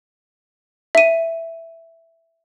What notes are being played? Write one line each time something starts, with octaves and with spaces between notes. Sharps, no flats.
E5 D#7